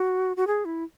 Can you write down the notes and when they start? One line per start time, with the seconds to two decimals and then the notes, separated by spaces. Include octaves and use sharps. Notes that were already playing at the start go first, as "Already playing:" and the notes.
Already playing: F#4
0.37 F#4
0.47 G#4
0.65 E4